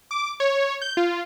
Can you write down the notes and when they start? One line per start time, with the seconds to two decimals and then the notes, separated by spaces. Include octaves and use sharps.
0.11 D6
0.40 C#5
0.81 G6
0.97 F4